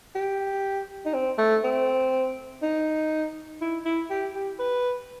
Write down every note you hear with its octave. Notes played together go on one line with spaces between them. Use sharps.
G4
D#4
C4
A3
C4
D#4
E4
E4
G4
G4
B4